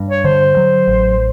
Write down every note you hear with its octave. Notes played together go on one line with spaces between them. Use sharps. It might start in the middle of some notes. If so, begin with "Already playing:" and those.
Already playing: G2
C#5
D3 C5
F#3
A1